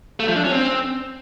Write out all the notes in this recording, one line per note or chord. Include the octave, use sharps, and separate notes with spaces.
A3
F3
D4
C#4
C4